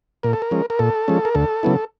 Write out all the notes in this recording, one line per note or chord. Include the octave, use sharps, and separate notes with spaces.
A#2 A#4
A4
A#4
F3 G#3 C#4
A#4
A#2 A4
F3 G#3 C#4
A#4
D2 A4
C#3 F#3 B3 E4